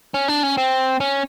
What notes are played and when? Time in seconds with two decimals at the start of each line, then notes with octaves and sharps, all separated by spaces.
0.14 C#4
0.28 D4
0.43 C#4
0.57 C4
1.00 C#4